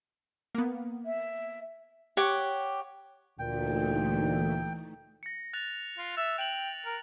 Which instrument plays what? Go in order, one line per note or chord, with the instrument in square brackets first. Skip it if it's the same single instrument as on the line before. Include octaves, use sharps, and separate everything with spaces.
[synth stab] A#3 B3
[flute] E5
[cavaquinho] G4 C#5 F#5 D6
[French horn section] D2 A#2 [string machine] E3 A3 D#4 [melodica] G5
[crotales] A#6 C#7
F#6 A6 F7
[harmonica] F4
[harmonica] E5 [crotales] A6
[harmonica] G5 [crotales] F7 F#7
[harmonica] A#4